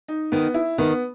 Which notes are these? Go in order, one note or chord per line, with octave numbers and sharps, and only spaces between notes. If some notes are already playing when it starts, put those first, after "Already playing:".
D#4
D#3 B3
E4
D#3 B3